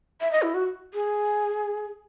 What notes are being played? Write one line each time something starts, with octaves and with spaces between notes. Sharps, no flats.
E5
D#5
E4
F#4
G#4